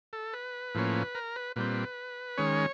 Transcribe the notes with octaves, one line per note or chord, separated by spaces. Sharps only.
A4
B4
A2 F3 A#3 C#4
A#4
B4
A#2 G3 C4 B4
D#3 G#3 C#4 C#5